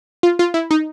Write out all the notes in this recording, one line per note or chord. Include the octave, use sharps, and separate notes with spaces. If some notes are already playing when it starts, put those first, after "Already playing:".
F4
F4
E4
D#4